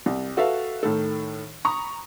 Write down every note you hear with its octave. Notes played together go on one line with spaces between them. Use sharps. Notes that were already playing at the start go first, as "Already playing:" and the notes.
C2
F#4 A4 B4 E5 F5
A2 D#3 A4
A#5 B5 C#6 D#6